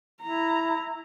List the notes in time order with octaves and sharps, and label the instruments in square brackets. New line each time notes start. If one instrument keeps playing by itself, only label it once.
[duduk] E4 [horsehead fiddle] A#5